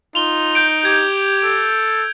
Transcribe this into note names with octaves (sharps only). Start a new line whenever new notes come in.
D#4 F4 F7 G7
G6 D7
G4 G#6
A4